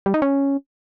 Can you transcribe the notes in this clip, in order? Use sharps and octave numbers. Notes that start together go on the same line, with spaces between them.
G3
D#4
C#4